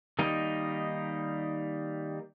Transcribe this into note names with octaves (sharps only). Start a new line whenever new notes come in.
D#3 G3 A#3 D#4